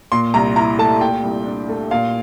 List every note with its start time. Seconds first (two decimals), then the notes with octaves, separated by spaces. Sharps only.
0.12 A#2 C6
0.34 C2 A#5
0.56 E4 A#5
0.79 A3 A5
1.01 A#2 G5
1.24 C2
1.46 D4
1.69 A3
1.91 A#2 F5